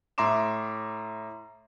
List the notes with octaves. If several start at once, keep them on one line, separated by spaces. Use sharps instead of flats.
A2 E5 A#5 C6 D6 E7